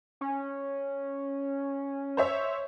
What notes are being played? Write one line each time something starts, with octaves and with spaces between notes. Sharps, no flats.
C#4
C5 C#5 E5